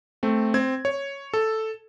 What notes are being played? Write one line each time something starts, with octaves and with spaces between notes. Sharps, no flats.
A3 C4
C4 G#6
C#5
A4